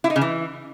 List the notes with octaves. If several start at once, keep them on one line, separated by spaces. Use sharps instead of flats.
E4
D#4
C#3
E3